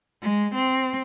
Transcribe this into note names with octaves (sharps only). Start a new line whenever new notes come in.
G#3
C4